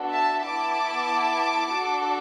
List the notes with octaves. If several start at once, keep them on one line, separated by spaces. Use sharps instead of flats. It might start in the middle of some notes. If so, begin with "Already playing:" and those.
Already playing: B3 D4 F#4 A4
E5 A5
B3 E4 A4 A5 D6
D4 F#4 A4